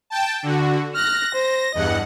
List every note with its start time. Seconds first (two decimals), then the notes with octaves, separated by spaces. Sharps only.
0.10 G5 A5
0.43 D3 F#4
0.94 F6 F#6 A#6
1.34 C5
1.74 E2 G2 D#5 F#5